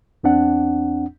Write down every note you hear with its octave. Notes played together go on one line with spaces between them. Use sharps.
E2 C4 D4 F#5